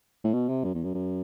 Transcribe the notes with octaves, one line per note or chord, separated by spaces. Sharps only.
A2
B2
C3
F#2
E2
F#2
F#2